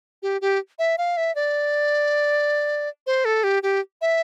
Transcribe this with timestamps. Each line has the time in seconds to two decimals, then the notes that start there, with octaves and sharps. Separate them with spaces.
0.22 G4
0.41 G4
0.79 E5
0.98 F5
1.17 E5
1.35 D5
3.07 C5
3.25 A4
3.44 G4
3.63 G4
4.01 E5